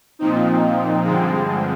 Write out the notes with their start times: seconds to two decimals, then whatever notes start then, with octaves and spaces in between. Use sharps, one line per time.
0.19 A#2 F3 C4 D#4
1.03 G2 D3 F3 G#3 C4